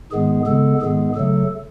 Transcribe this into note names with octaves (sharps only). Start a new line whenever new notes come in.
G#2 D#3 G#3 B3 G#4
C#3 G#3 B3 A4
G#2 D#3 G#3 B3 G#4
C#3 F#3 A3 A4